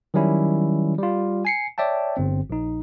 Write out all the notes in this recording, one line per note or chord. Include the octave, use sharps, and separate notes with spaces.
D#3 F#3 G3 C#4 E4
G3 F4
G#5 C7 C#7
C#5 D5 E5 G5 A5
G1 C4
A#1 D#4